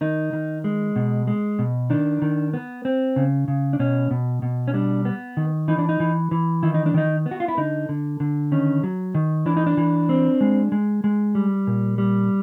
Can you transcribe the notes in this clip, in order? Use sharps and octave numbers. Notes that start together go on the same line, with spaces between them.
D#3 D#4
D#3
G#3
B2
G#3
B2
D#3 D4
D#3
B3
C4
C#3
C#3
D4
B2 C#4
B2
B2
C#4
G3 D4
B3
D#3
E3 D#4
D4
D#4
E3
E3
D#3 E4
D#4
D4
D#3 D#4
B3
F#4
F4
E4
D3 D#4
D3
D3
D#3 C#4
F#3
D#3
E3 D4
D#4
D4
E3
C4
G#3
G#3
G#3
G3
A#2
G3